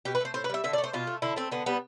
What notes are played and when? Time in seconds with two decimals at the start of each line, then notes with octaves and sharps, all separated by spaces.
0.05 B2 G4
0.15 B4
0.21 A3 C5
0.34 A2 C5
0.44 B4
0.50 G3 E5
0.64 D3 E5
0.73 D5
0.78 A3
0.84 C5
0.93 B2 F4
1.07 A3
1.22 D3 E4
1.36 A3 C4
1.51 D3 B3
1.66 G3 B3